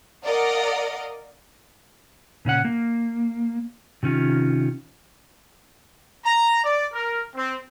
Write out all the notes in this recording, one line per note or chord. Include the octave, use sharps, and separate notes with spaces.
A#4 D5 D#5 F5 F#5
A#2 C#3 C#4 F#5
A#3
C3 D#3 C#4 F4
A#5
D5
A#4
C4